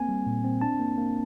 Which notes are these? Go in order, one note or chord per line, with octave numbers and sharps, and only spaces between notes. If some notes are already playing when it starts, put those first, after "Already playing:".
Already playing: A#3 C4 G#5
G3
A#2
C4
D4 A5
A#3
A#3